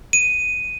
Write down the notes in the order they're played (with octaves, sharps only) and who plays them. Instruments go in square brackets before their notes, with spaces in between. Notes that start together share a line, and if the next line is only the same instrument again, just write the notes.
[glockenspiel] D#7